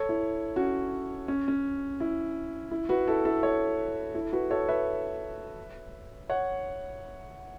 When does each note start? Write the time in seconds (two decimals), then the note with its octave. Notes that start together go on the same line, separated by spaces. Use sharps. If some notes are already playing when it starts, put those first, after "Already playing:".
Already playing: A4 C#5
0.09 E4
0.56 C#4 F#4
1.28 C#4
1.48 C#4
2.00 E4
2.71 E4
2.89 F#4 B4
3.07 E4 A4
3.25 E4 A4
3.43 A4 C#5
4.14 E4 A4
4.33 F#4 B4
4.50 A4 C#5
4.68 B4 E5
6.30 C#5 F#5